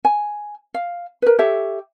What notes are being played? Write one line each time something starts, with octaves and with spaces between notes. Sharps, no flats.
G#5
F5
A#4 B4
G4 A4 C#5 E5